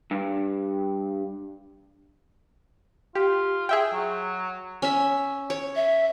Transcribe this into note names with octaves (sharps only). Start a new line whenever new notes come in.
G2
F4 G4
G#4 E5 G5
F#3
C#4 E5
C#5
E5